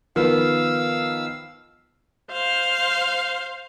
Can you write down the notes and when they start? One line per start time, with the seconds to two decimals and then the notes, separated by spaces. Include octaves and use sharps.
0.16 D#3 F3 B3 F5 E6
2.31 C5 F5